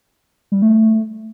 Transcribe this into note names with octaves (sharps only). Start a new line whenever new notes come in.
G3
A3